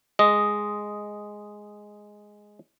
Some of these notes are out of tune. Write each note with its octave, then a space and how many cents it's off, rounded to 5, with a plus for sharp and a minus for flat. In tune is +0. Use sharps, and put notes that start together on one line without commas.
G#3 +0 D#5 +0